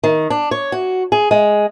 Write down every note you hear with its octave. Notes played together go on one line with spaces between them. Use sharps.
D#3
D4
C#5
F#4
G#4
G#3